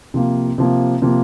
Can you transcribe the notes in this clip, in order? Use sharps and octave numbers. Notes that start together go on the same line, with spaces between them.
C3 F3 A#3
C3 F3 A#3
C3 F3 A#3